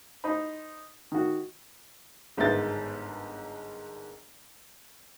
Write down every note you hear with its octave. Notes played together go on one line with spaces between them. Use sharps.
D#4 C5 B5
D#3 F#4
G1 G#2 D#3 B3 G6 A6